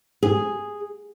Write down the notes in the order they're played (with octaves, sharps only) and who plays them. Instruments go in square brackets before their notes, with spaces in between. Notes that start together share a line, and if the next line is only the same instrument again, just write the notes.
[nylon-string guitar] G#4